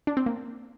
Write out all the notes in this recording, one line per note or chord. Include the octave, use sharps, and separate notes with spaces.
D4
C4
A#3